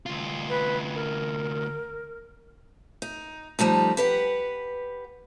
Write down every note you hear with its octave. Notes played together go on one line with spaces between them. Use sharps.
D2 F4
B4
A#4
D#4
F3 G3 A3 D#4
G4 B4 F#5